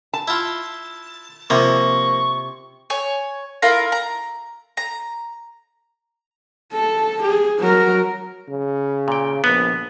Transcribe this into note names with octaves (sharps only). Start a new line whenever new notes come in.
A5
E4 F4
C3 F3 A#3 C#6
C#5 G#5
E4 F4 A#4 A#5
A#5
A#5
A4
G#4
F#3 A#4
C#3
A#2 G5
A#1 B3 B4